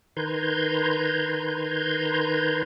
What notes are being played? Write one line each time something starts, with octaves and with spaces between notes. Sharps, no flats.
D#3 B4 A#5 C6 G6 G#6